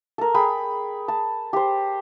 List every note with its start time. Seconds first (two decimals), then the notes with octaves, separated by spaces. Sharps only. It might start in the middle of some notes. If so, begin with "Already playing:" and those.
0.18 A4 A#4
0.34 G#4 G5 B5
1.08 A5
1.53 G4 C5